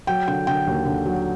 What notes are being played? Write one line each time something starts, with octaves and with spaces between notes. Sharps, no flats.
F#3 G5
D3 G5
D3 G5
D#2
D3
F#3